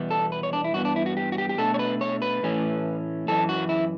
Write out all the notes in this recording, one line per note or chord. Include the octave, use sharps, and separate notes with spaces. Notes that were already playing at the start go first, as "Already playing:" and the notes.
Already playing: E2 B2 G3 B3
A4
B4
C#5
D4
E4
G2 E3 B3 F#4
D4
E4
F#4
G4
F#4
G4
G4
B2 A3 D4 A4
C#5
B4
C#5
B4
A2 E3 A3 C#4
F#2 E3 A4
F#4
E4